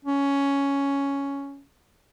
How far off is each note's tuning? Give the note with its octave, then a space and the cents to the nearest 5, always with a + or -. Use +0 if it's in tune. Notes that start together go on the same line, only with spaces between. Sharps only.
C#4 +5